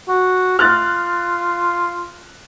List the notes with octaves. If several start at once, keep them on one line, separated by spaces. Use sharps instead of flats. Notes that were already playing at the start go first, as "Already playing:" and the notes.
F#4
F4 F6 F#6 A6